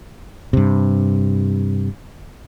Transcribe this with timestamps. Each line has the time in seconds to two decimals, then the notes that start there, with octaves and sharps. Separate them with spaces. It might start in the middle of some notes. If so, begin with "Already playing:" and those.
0.53 G2 C3